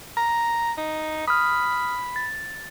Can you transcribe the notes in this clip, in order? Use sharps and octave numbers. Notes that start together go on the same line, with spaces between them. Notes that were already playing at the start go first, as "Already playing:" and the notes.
A#5
D#4
B5 D#6 F6
A6